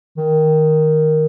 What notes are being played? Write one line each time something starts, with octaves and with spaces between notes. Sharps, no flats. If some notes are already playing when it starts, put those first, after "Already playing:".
D#3